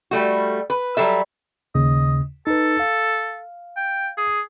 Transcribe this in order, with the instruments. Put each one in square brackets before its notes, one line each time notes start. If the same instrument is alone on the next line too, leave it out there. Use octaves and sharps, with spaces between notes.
[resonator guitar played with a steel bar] G3 A3 F#4
B4
F#3 G3 A4 E5
[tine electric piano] D#2 C#3 [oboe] D#5
[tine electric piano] D#4 B4 [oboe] A4
[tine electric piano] F5
[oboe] G5
G#4